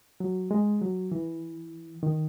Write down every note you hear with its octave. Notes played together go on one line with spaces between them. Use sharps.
F#3
G#3
F#3
E3
D#3